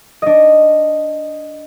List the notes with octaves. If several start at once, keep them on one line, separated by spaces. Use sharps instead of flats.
D4 D#5